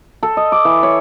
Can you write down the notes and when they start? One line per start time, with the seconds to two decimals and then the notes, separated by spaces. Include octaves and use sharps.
0.23 A4
0.37 D#5
0.52 D6
0.65 E3
0.83 C#5